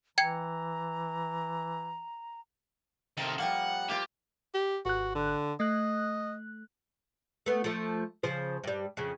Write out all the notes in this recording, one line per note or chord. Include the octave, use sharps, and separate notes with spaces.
E3 G5 A#5 G#6 C#7
C3 D#3 A4 A#4
F3 G3 A#3 F#5
A#3 F4 G4
G4
G#1 F#4 F#6
D3
A3 D#5 F#6
A3 B3
F3 A3
C#3 F3 C5
G2 G3
F2 C#3